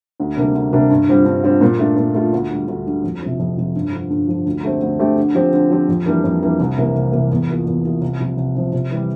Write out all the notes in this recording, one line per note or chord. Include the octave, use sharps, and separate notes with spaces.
D2
C3 G3 A#3 D4
D2
C3 G3 A#3 D4
G2
D3 G3 C4 F4
G2
D3 G3 C4 F4
A#2
A3 D4 F4
A#2
A3 D4 F4
D2
D3 G3
D2
D3 G3
F2
C3 F3
F2
C3 F3
G2
D3 F3
G2
D3 F3
D2
D3 A3 C4 G4
D2
D3 A3 C4 G4
D3
F3 C4 G4
D3
F3 C4 G4
F2
E3 G3 A#3 D4
F2
E3 G3 A#3 D4
C2
C3 E3 A#3
C2
C3 E3 A#3
E2
E3 A#3 F4
E2
E3 A#3 F4
C2
C3 F3
C2
C3 F3
C3
E3 G3